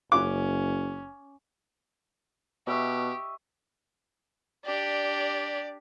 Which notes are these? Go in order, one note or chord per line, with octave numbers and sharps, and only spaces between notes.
F#1 C#4 D6
B2 G4 D#5 E5 C#6
D4 G4 D5